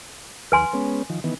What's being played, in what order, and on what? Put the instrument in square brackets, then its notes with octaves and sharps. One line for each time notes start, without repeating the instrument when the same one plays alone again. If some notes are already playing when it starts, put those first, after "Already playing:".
[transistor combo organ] D#2 [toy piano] B4 G#5 C6
[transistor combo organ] G#3 B3 C#4
D#3 F3
D#3 E3 B3